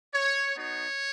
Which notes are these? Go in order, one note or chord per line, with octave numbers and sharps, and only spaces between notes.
C#5
B3 D#4 F#4 C#5